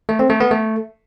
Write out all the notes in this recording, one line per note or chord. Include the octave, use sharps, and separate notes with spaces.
A3
C4
A3
B3
A3